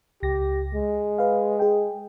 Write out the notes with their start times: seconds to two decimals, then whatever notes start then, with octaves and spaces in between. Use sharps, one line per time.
0.23 C#2 G4 A#6
0.75 G#3
1.18 B4 F5
1.59 G#4 G5